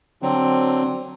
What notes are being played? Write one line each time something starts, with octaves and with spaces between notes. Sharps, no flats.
D3 F#3 C4